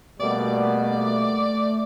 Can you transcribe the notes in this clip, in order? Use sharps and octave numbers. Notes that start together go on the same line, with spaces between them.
B2 G3 A3 A#3 D5